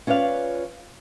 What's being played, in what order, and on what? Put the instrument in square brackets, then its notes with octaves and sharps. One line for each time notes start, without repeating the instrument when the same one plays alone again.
[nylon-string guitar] C#4 F4 B4 D5 F5